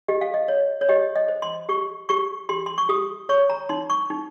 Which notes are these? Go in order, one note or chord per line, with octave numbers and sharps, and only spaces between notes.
G4 D#5
F5
D#5
C#5
C#5
G4 D#5
D#5
C5
C6
G4 C#6
G4 C#6
G4 C6
C6
C#6
G4 D#6
C#5 C#6
A#5
D#4 C6
C#6
D#4